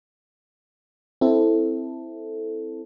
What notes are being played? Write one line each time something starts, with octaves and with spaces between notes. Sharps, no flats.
C4 E4 A4